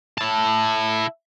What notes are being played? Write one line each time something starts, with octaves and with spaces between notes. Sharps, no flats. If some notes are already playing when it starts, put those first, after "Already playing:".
E4 A5